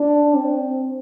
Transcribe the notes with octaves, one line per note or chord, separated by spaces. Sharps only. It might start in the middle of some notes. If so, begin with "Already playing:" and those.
Already playing: D4
C4